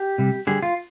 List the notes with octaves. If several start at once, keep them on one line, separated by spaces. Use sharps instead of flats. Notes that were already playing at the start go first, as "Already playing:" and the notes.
Already playing: G4
C3 G3
D3 G3 G#4
F4